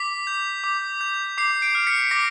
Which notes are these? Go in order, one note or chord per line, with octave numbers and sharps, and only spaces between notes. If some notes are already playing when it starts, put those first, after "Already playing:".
Already playing: D6 B6
G6
D6
G6
D6 C7
C7 D7
F6
B6 C#7
D6 A#6